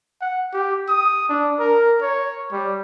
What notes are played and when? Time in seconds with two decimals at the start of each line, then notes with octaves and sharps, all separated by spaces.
0.21 F#5
0.53 G4
0.89 D#6
1.29 D4
1.59 A#4
2.01 C#5
2.52 G3